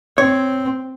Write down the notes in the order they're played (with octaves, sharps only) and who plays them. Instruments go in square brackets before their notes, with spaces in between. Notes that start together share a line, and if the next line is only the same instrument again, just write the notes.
[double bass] C4 [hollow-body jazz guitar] C#5